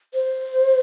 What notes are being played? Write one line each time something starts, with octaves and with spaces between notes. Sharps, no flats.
C5